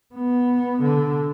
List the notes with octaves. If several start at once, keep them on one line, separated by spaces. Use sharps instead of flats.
B3
D3